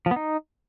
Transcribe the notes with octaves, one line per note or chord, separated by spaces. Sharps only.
F3
B3
D#4